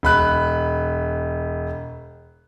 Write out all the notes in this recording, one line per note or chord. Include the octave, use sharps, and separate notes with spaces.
E1 B5 F#6